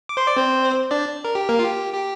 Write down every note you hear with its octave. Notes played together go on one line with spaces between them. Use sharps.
D6
C5 C6
D5 D6
C4 C5
D4 D5
A#4
G4
A#3 A#4
F4
G4
G4